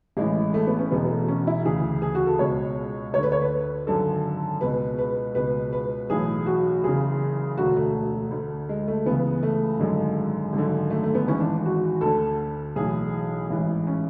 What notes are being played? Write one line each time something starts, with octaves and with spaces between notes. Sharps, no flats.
A1 A2 E3 G#3
A3
B3
C#4
E1 E2 B2 B3
A3
C#4
E4
D2 C#3 E3 G#4
G#4
F#4
A4
C#2 B2 C#5
D2 C#5
D3 B4
C#5
B4
G#1 F#2 D3 A4
C#2 B2 B4
B4
C#2 B2 B4
B4
B1 A2 E3 G#4
F#4
F#1 E2 C#3 G#4
E1 D2 D3 F#4
A3
D2 D3
G#3
A3
C#2 C#3 E3 B3
A3
G#1 F#2 D3 G#3
G#1 F#2 D3
A3
A3
B3
G#1 G#2 E3 C#4
D4
F#4
D2 D3 A4
B1 A2 E3 G#4
A1 G#2 E3
C#4